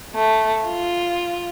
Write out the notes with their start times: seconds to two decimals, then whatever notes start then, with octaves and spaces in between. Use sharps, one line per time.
0.14 A3
0.65 F4